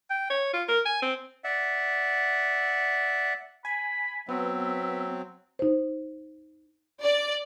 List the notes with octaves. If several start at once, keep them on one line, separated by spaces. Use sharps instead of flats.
G5
C#5
F4
A#4
G#5
C4
D5 E5 F#5
G#5 B5
F#3 B3 C4 E5
D#4 C5
D5